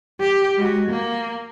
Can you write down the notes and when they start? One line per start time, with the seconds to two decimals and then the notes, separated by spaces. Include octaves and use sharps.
0.20 G4
0.58 G#3 F#4
0.89 A#3